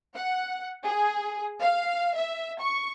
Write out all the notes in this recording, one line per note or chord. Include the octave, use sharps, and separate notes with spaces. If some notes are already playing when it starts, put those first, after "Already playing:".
F#5
G#4
F5
E5
C#6